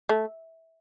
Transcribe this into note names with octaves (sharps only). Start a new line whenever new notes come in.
A3